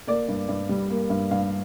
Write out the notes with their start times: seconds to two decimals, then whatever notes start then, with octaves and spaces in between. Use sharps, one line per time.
0.07 A#3 D5
0.29 G2
0.49 G2
0.69 G3
0.90 A#3
1.10 G2
1.31 G2 F5